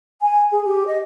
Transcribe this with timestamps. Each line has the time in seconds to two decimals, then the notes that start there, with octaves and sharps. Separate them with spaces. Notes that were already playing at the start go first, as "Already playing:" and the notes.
0.21 G#5
0.51 G#4
0.65 G4
0.86 D#5